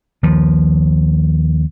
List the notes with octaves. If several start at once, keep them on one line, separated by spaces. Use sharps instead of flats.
D#2 F3